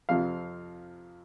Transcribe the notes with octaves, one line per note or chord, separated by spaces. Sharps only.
F2 C3 F3 F5